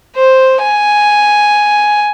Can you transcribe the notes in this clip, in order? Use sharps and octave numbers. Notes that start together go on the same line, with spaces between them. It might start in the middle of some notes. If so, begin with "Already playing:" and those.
C5
G#5